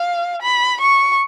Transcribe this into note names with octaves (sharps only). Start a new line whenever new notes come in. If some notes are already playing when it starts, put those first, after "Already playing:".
Already playing: F5
B5
C#6